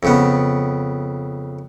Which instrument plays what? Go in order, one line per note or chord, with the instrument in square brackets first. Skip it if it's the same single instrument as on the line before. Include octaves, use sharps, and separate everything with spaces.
[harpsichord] F2 C#3 B3